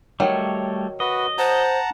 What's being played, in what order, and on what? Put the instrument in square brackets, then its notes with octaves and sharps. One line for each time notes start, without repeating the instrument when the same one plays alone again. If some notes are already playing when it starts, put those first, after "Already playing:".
[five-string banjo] D#3 F#3 [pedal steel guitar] G3 A3 C#5
[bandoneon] F#4 B4 [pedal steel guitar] D#5
[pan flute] C5 [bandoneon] F#5 A5 A#5